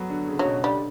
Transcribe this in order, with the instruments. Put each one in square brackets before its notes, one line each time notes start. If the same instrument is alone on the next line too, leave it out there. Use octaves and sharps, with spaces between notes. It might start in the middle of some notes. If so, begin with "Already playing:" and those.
Already playing: [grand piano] F#3 A3 B3
D3
C#3
[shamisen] F#3
[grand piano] B2
[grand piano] D3 [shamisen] G3